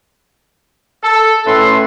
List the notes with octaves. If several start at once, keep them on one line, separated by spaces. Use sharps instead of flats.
A4
A2 C#4 A4 B4 E5 C6